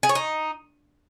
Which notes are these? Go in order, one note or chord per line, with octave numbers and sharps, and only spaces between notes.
G#4
C#5
D#4